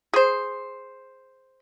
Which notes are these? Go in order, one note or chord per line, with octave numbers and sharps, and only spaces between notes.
G#4 C5